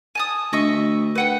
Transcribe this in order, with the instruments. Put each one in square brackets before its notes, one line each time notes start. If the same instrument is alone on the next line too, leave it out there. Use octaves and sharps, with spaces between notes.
[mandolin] G#5 A5 D#6
[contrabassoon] D2 [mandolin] D#5 E5 C#6
[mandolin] B4 F#5 G5